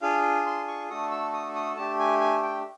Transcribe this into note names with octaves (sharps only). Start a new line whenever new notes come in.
D4 F4 G#4 F5
C6
C#6
A3 D4 F#4 A4 D#6
E6
D#6
D#6
A3 D4 G4 A5
G#5
G#5
G5